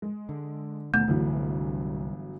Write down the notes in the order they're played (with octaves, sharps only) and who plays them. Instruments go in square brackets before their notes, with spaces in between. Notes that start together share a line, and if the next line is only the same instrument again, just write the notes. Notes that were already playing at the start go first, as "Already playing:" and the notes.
[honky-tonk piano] G#3
[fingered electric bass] D3
[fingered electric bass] D#2 B2 D3 [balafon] A3
[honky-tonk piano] G1 E3 F#3 [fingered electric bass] C2 D3